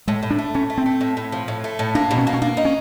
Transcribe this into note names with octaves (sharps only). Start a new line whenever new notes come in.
A2 G#3
A2
D4
A3
A2 C#4
A3
C4
A3
A2
A2
F3
A2
A3
A2
A#3 D4
B2
C#4
A#3
C#4
A#3 D4
D#4
C#4